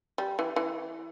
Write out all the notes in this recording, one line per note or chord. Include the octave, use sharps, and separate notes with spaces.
G3
E3
E3